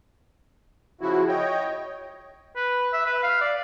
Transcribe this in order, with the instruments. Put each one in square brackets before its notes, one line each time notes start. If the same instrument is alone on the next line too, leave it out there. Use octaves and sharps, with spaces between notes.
[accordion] C#3 F3 E4 F#4
C#5 D#5 G5
[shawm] B4
E5
B4
F5
D5